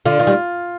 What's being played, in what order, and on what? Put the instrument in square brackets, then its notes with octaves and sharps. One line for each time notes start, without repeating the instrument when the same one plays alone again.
[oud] D3 [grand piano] F4
[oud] D#3 [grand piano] F4
[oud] G3